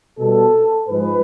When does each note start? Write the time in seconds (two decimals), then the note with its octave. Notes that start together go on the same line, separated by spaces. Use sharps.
0.19 B2 G3 B3 A4
0.89 G#2 F3 G#3 B4